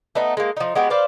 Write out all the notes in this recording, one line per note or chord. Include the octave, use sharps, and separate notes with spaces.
A3 B3 D#4
G#3 A#3
F3 D#4
G#3 B3 F#4 G4
B4 C5 D5 F5